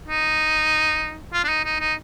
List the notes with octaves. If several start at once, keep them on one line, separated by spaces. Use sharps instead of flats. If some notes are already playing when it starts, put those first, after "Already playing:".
D#4
F4
D4
D#4
D#4
D#4